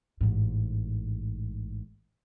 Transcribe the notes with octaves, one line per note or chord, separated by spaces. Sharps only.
A1 G#2